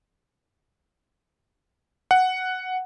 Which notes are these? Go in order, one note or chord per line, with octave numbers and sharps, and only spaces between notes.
F#5